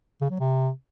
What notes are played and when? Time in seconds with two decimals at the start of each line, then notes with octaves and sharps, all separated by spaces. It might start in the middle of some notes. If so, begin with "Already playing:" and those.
0.21 C#3
0.31 F#3
0.40 C3